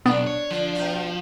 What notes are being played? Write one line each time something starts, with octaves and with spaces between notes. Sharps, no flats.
B1 B3 D4
C#5
D3 F3
B2 F4